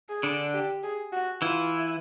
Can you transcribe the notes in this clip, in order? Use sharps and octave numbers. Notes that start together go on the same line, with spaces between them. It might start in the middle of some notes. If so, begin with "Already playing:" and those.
G#4
D3 D4
G4
G#4
F#4
E3 E4 F4